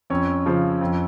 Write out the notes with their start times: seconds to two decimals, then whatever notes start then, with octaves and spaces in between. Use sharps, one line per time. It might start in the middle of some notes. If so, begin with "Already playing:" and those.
0.10 F2 C#4
0.46 C#3 F3
0.81 F2